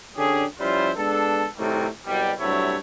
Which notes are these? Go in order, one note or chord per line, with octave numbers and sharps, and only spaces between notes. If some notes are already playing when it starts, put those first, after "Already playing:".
D3 C#4 D4 G4 G#4
F3 G3 C#4 E4 F4 C5
G#3 B3 D4 A4
A2 C3 D#3 F#3 G3 A3
C2 B2 F#3 G3
G2 C3 F#3 A3 E4 C#5